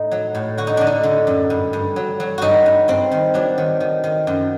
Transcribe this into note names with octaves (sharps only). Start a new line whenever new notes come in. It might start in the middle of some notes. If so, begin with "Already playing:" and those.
Already playing: A2 D#4
F#3
A2
D3 F#4
D#4
D3 D4
D#4
D3
F#2
G2
G2
F#3
F#3
G2 D#4 F#4
G2
G2 C4
D#3
F#3 D4
D#3
D#3
D#3
F#2